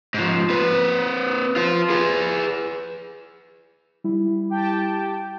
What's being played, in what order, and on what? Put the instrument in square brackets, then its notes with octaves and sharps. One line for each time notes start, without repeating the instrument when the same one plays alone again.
[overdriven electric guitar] G#2 F3
C4 B4
F4 C5
G#4 B4
[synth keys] G3 E4
[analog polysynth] G4 G5 A5